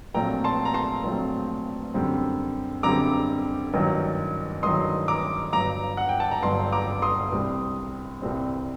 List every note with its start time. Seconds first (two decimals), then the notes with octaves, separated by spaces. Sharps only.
0.14 A#1 A#2 F#3 A3 C4 G5 A#5
0.44 A5 C6
0.65 A#5
0.74 A5 C6
1.04 A#1 A#2 F#3 A3 C4
1.94 F#2 D3 G3 C4
2.83 F#2 D3 G3 C4 A#5 D6
3.74 A1 G2 D#3 F#3
4.63 A1 G2 D#3 F#3 C6 D#6
5.08 A#5 D6
5.53 G1 G2 F#3 A#5 D6
5.97 F#5
6.09 G5
6.20 A5
6.31 A#5
6.42 G1 G2 F#3 A5 C6
6.72 A#5 D6
7.02 C6 D#6
7.32 C2 C3 G3 C4
8.22 C2 C3 G3 C4